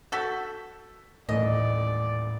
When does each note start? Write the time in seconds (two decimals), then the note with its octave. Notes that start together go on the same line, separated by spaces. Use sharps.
0.12 F#4 A4 E6 G6 B6
1.29 D#1 A1 A2 D5 D#5